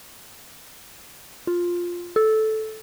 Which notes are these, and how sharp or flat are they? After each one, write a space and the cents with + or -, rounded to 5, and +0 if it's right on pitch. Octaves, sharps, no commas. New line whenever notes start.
F4 +5
A4 -10